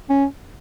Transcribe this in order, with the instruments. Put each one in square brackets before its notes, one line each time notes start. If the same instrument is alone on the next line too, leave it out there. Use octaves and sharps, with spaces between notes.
[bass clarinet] C#4